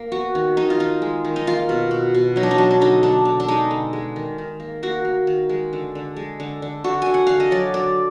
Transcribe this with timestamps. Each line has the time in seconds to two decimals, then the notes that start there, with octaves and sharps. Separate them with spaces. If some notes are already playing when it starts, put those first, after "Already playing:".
Already playing: A#3
0.12 B3 F#4
0.35 D#3
0.57 D#3 D#4
0.70 F4
0.80 D#3 D#4
1.02 G#3
1.25 D#3
1.36 D#4
1.47 A#3 F4
1.69 B2
1.91 B2
2.14 B2
2.36 F#3 D#4
2.43 D4
2.51 D#4
2.58 F#3 D4
2.71 D4
2.81 D3 D#4
3.03 D3 D4
3.25 D3
3.40 D4
3.48 G#3 D#4
3.71 D3
3.93 G#3
4.16 D#3
4.38 D#3
4.60 A#3
4.83 A#3 F#4
5.05 A#3
5.27 D#3
5.49 G#3
5.73 D3
5.95 D3
6.17 G#3
6.40 D3
6.62 D3
6.84 D3 F#4
7.02 D3 G#5
7.14 F#5
7.27 D3 F5
7.40 D#5
7.51 F#3 D5
7.74 D3 D5